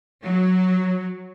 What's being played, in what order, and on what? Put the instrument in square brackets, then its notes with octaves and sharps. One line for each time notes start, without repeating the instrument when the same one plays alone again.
[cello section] F#3